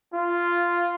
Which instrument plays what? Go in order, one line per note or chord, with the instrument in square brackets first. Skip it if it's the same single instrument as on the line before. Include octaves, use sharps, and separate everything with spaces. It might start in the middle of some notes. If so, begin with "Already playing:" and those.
[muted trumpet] F4